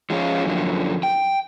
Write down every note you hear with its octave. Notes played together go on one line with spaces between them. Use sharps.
F3 G#3 C#4 F4
F#2 D3 F3
G5